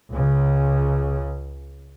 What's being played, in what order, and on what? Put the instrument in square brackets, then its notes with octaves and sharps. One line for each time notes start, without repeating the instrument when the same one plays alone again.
[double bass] C#2 C#3